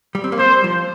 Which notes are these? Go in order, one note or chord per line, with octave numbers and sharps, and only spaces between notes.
G3
C4
A#3
G3 C5
F3